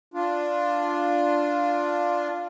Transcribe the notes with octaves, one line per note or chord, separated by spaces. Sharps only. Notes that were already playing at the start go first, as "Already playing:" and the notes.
D4 F4